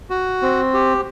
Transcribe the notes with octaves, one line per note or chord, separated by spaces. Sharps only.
F#4
C4
G4